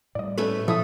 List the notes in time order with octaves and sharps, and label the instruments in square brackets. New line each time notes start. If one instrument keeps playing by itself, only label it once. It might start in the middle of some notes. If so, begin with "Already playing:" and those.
[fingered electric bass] A2 G3 [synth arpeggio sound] D5 D#5
[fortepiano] A3 [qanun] C#4 B4 E5
[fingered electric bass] A#2 [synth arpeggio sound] F3 E4 [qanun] A4 [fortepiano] E5 D#6